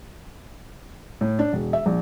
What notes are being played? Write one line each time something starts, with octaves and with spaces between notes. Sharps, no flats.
A2
D4
E1
E5
A#1